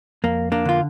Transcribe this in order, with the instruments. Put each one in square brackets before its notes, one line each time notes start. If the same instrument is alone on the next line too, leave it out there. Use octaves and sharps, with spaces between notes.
[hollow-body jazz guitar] F2 A#3
A#3 D4
D3 F4